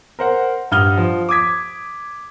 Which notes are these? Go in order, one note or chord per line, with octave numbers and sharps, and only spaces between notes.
A#4 C5 F#5
G2 F#5 D#6 F6 G7
F3
D6 D#6 G#6 B6